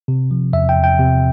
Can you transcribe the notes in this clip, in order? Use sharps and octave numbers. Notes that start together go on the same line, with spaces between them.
C3
F3
E2 E5
G5
E2
G5
C3